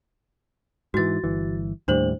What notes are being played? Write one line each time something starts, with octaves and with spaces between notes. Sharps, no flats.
G#2 E3 F#4 A6
G1 E3
D#2 A2 G3 D4 C5 F#7